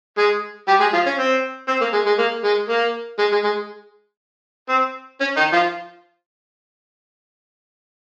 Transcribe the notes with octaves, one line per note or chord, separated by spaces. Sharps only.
G#3 G#4
G3 G4
G#3 G#4
F3 F4
C#4
C4
C4
A#3
G#3
G#3
A#3
G#3
A#3
G#3
G#3
G#3
C4
C#4
D#3 D#4
F3 F4